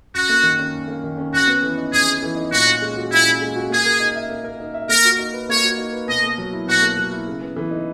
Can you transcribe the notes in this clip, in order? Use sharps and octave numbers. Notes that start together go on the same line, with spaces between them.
F#2 F#4
A#3
D#3
C#4
F#2
A#3
D#3
C#4
F#2 F#4
B3
E3
D#4
F#2 G#4
B3
E3
D#4
A#2 F#4
C#4
G#3
F#4
A#2 E4
C#4
G#3
F#4
A#3 G#4
A#4
D#4
E5
A#3
A#4
D#4
E5
A#3 A#4
F#4
D#4
B4
A#3 C#5
F#4
D#4
B4
B2 D#5
A#3
F#3
E4
B2 F#4
A#3
F#3
E4
C#3
B3
E3
D#4